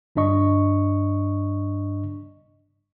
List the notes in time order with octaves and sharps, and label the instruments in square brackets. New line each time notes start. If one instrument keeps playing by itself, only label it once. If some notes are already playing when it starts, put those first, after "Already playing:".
[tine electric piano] G1 G2 D4 D#5 C#6